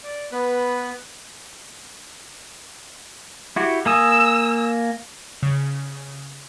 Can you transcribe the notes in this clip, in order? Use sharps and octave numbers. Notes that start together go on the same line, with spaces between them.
D5
B3 B4
E4 F#4 G4
A#3 G#5 D#6 E6
C#3